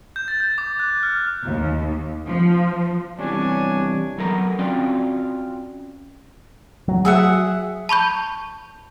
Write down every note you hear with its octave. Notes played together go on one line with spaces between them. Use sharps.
G6
A6
G6
D6
F#6
F6
D#2
F3
E2 C3 E3 G3 D4 C#5 G#5
F#3 B3 A4 A#4 A5 A#5
C4 C#4 F4 F#4 D5
F#3
G#4 E5 F#5
A5 B5 C#6 G6